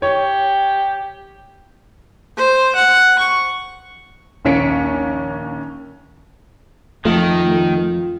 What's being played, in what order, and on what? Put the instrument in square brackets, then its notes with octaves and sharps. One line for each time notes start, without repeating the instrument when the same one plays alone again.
[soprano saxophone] G4 [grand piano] C#5
[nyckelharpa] C5
F#5
C#6
[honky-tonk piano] A#1 D#2 C#4 B6 C#7 D7
[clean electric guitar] F2 [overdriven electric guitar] D#3 [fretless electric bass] A3 [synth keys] F4